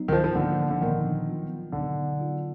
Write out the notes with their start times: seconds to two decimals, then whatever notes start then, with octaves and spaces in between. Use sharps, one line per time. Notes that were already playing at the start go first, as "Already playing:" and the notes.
Already playing: F#3 B3 D#4
0.08 D#3
0.12 F3
0.24 F3
0.35 D3 F3 A#3 D4
0.70 D3
0.81 A#2 D#3 F3 B3 D4
1.27 F#3 B3 F4
1.72 B2 D3 F#3 B3 D#4
2.19 F#3 B3 F4